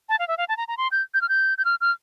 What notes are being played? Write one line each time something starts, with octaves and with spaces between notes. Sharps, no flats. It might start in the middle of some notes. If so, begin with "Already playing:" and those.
A5
F5
E5
F5
A5
A#5
A#5
C6
G6
G6
F6
G6
G6
F6
F6